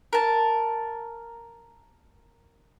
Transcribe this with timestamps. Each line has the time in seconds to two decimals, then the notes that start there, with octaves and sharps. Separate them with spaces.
0.13 A#4 A5